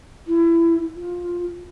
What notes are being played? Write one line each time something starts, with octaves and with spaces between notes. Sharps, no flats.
E4
F4